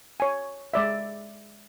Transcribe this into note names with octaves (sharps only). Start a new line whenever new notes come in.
C#5 G#5
G#3 D5 E5